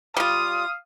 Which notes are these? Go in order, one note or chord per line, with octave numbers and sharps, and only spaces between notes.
G3 F4 F5 D#6